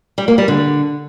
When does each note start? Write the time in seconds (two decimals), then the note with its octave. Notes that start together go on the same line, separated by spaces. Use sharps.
0.18 G3
0.28 A#3
0.38 G3
0.48 D3